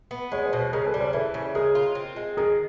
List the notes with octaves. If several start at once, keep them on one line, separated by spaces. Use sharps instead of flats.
B3
G#3 C#5
C5
B2
B4
C#3 G#4 A#4
A4 B4
G3
A#4 C5
E3 A4 B4
C#3
G#3 G#4 A#4
F4
C4
G#3
D#3 G#4 A#4